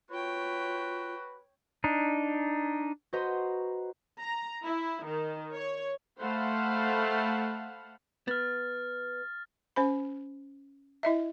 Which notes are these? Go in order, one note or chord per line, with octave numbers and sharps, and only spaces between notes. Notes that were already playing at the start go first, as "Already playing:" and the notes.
F4 F#4 B4 C#5 G5
D4 D#4
F#4 B4 C5 D#5 A#5 C6
A#5
E4
D#3
C#5
A3 C5 F5 F#5 A5 B5
B3 F6 A6
C#4 C5 B5
E4 D#5 E5